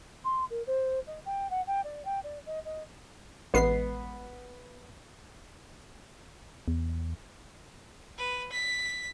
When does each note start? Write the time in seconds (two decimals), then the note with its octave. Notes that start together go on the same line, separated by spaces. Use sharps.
0.24 C6
0.50 A#4
0.67 C5
1.07 D#5
1.25 G5
1.50 F#5
1.67 G5
1.84 D5
2.05 G5
2.24 D5
2.46 D#5
2.65 D#5
3.54 A1 G#3 B3 C7
6.68 E2
8.18 B4
8.52 B6